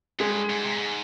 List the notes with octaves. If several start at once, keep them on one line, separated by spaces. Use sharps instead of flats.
G2 G#3 G#4
G#2
C3
A#2
G#2